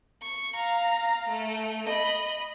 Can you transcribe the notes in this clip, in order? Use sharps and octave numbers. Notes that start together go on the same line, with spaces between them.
C#6
F5 A#5
A3
D#5 B5